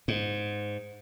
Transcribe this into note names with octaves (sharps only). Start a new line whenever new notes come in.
G#2